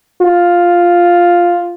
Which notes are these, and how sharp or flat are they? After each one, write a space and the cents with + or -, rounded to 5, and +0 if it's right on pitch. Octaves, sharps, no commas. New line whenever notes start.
F4 +0